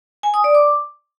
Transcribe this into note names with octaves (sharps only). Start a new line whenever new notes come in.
G#5
D#6
D5
D6